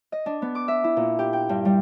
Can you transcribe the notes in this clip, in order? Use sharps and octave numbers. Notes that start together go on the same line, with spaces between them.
D#5
D4
B3
D6
E5
E4
A#2
G4
G5
G2
G3